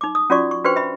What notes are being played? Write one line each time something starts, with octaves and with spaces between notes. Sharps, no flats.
D#4 D6
D#6
C#4 F4 F#4 D5 C#6
C#6
D4 F#4 B4 C5 G5 C#6
E5 B5 C#6